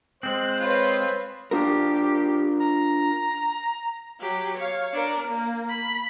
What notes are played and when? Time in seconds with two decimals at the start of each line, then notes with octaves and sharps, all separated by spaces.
0.23 G#3 C4 C5 F#6
0.61 F4 B4 C#5
1.51 D4 F4 G4 A#4
2.59 A#5
4.20 F#3 G4
4.58 C#5 F5
4.93 D4 A#4
5.28 A#3
5.69 B5